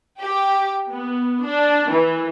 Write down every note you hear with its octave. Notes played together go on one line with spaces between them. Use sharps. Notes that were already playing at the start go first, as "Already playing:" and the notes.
G4
B3
D4
E3